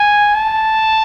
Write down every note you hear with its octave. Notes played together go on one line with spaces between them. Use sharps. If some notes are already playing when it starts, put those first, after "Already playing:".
Already playing: G#5
A5